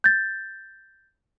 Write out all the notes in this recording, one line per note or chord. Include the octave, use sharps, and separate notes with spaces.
G6 A6